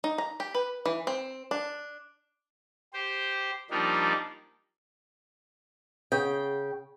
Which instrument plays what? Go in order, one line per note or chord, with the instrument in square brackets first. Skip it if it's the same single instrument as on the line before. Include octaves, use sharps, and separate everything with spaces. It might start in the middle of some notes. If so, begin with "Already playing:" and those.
[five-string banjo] D#4
A#5
G4
B4
E3
C4
D4
[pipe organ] G4 C5
F3 G3 A#3 D4 D#4
[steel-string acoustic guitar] C#3 G5